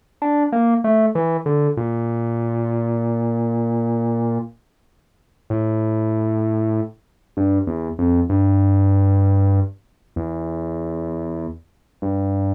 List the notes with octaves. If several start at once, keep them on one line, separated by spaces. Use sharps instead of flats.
D4
A#3
A3
E3
D3
A#2
A2
G2
E2
F2
G2
E2
G2